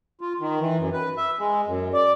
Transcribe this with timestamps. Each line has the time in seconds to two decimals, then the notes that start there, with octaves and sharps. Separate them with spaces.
0.21 F4
0.40 D#3
0.60 E3
0.78 F#2
0.93 B4
1.17 E5
1.39 G#3
1.67 F#2
1.94 D5